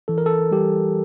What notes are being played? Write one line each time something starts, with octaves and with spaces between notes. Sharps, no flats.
E3 A4
A#4
A4
G3 G4